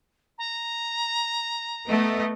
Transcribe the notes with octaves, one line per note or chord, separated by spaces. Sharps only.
A#5
A3 B3 D#5